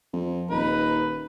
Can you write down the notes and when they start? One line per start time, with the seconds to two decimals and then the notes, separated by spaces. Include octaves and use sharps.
0.13 F2
0.50 D#1 D#4 B4